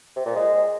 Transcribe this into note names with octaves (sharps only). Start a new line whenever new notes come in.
C3
A#2
G#3